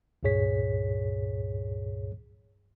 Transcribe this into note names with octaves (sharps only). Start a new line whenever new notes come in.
C#2 G2 A#2 G#4 C#5 B6